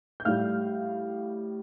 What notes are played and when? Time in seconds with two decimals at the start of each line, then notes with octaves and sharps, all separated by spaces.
0.20 G6
0.25 A2 G3 F5 F6